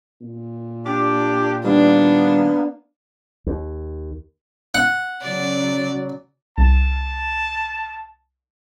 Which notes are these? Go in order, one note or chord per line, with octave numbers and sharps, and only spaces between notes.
A#2
D4 G4 D6
D#3 G3 A#3 B3 D4
D#2
F#5
C#3 F#3 D5
C2 A5